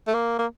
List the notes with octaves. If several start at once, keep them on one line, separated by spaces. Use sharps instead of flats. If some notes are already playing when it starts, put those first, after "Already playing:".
A3
A#3
A#3